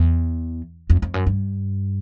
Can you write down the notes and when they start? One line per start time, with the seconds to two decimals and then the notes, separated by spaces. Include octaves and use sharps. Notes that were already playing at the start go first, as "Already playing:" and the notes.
Already playing: E2
0.90 F2
1.02 F2
1.14 F#2
1.27 G2